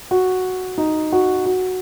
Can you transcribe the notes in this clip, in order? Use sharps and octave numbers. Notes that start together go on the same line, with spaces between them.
F#4
D#4
F#4
F#4